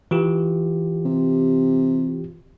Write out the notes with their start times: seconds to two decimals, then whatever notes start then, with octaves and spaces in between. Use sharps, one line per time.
0.11 E3 F4 G4
1.05 C3